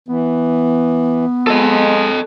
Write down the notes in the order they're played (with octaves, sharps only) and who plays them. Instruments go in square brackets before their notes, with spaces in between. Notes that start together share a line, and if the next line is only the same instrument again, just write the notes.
[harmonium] E3 [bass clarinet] B3
[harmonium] G#3 [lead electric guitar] A4 D#5